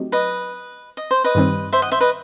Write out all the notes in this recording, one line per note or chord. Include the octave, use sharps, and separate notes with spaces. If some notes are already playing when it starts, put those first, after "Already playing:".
Already playing: F#3 A3 C4 D#4 G4
B4 D#5
D#5
C5
B4 D#5
G2 D#3 G3 C4
C5 E5
D#5 F#5
C5 E5
B4 D#5